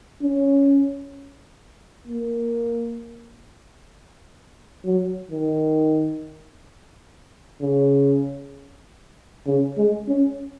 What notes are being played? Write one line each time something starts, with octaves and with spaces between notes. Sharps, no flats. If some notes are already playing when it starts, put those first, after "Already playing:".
C#4
A#3
F#3
D#3
C#3
C#3
G#3
C#4